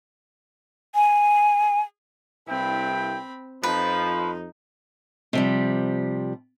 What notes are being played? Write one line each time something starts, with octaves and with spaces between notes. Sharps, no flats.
G#5
C2 G2 C4 E4 G5 B5
F2 F3 D#4 B4
C3 F3 G3